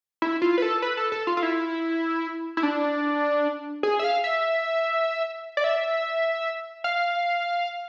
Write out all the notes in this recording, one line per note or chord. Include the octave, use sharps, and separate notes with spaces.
E4
F4
B4
A4
B4
A4
A4
F4
F4
E4
E4
D4
G#4
E5
F5
E5
D5
E5
F5